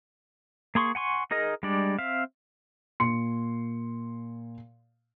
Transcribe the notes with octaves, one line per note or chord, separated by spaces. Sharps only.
A#3 G#4 C6 C#6
F#5 G#5 C6 C#6
D#4 G#4 A#4 D#5
G3 G#3 D4 D5
C4 E5 F5
A#2 C6 C#7